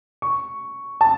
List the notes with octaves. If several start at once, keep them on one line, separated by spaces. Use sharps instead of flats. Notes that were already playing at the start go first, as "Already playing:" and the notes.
C#6
A5